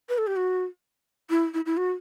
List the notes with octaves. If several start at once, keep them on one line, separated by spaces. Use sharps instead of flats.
B4
A4
G4
F#4
E4
E4
E4
F#4